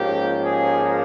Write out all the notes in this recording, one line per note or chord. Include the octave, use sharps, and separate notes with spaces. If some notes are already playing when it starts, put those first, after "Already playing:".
Already playing: G#2 F3 A#3 C#4 G4
G#4